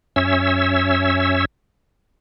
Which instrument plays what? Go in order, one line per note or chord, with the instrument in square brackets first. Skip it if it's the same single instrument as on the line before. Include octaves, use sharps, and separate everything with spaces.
[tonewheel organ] F#2 C#4 C#5 E5 E6